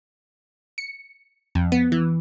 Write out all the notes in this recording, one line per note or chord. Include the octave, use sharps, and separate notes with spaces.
C#7
F2
B3
E3